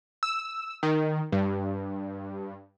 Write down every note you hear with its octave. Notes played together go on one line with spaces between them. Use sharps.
E6
D#3
G2